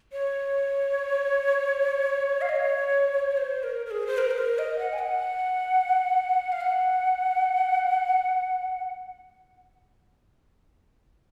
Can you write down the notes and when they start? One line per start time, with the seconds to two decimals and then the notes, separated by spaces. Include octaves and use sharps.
0.12 C#5
2.41 F5
2.49 D#5
2.56 C#5
3.37 C5
3.63 A#4
3.86 A#4
3.91 G#4
4.07 C5
4.18 A#4
4.31 C5
4.38 A#4
4.58 D#5
4.79 F#5
4.93 G#5
4.99 F#5
6.52 F5
6.61 F#5